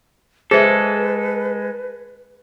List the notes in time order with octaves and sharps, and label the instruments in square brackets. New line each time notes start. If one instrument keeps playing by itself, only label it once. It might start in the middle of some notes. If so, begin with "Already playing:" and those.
[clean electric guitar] G#3 A4 [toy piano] G#4 [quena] B4 [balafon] C5 E5